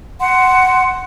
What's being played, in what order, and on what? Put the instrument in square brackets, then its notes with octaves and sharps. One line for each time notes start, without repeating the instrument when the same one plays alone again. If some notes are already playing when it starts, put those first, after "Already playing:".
[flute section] F#5 C6